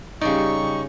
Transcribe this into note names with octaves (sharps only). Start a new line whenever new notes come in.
C#3 G3 D#4 G4 D5 C#6